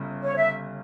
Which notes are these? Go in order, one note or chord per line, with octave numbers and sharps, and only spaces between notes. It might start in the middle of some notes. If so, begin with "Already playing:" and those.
Already playing: G1 C#3
C#5
E5